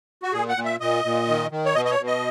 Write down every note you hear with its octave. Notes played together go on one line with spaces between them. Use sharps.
F#4
A#2 G#4
F#5
A#2
E5
A#2 D#5
A#2
D#3
D#3
C#5
B2 D#5
D#5
C#5
B2
D#5